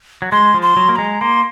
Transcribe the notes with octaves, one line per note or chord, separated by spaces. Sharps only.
F#3
G#3 C6
F3
C6
F#3
A#3 C6
G#3 A#5
A#3 C6